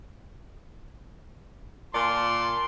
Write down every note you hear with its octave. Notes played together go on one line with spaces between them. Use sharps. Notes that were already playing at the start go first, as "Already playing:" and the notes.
A#2 D5 A5 C6